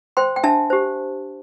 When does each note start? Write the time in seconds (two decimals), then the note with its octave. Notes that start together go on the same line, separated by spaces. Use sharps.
0.17 C5 G5 C6
0.36 G5
0.44 D4 E5 A5
0.70 G4 C5